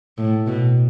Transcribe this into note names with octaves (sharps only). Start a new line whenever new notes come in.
A2
B2